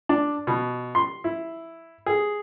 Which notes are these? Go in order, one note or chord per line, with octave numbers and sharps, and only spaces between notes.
D4
B2
C6
E4
G#4